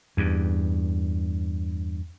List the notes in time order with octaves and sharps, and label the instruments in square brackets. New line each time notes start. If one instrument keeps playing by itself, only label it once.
[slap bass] E2 G2